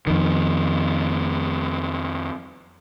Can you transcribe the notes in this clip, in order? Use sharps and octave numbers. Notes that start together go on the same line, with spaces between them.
F2 D#3